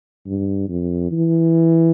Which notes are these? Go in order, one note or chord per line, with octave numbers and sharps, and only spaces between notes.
G2
F2
E3